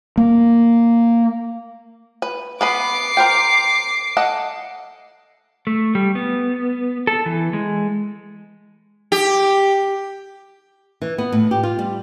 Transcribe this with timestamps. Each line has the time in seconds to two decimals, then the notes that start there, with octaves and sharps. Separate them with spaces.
0.17 A#3
2.22 B4
2.61 B3 B4 B5 D6 C7
3.17 A#4 C5 G5
4.17 A4 D#5 F#5
5.67 A3
5.95 G3
6.15 B3
7.07 A4
7.26 E3
7.53 G#3
9.12 G4
11.02 E3
11.18 B3
11.32 A2
11.51 G4
11.63 F4
11.79 G3